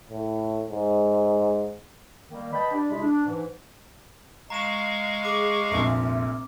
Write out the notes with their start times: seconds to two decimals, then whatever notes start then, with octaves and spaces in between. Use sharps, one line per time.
0.10 A2
0.71 G#2
2.31 D#3 G3 A#3
2.52 B4 D#5 G5 A5 B5
2.72 D4 G4 D5
2.90 C3 G#3 E4 G#4 B5
3.01 D4
3.26 G#2 E3
4.50 G#3 F5 A#5 C#6 E7
5.25 G#4 D6
5.71 F1 A#1 A#2 E5